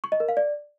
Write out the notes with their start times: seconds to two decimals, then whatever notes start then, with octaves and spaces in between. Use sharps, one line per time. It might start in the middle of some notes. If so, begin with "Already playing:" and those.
0.04 C#6
0.12 D#5
0.20 A#4
0.29 F5
0.37 D5